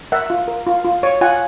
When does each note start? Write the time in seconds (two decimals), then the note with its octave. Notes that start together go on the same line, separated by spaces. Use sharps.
0.12 A#4 E5 F#5
0.30 F4
0.48 A#4
0.67 F4
0.85 F4
1.03 C#5
1.21 F4 F#5 G#5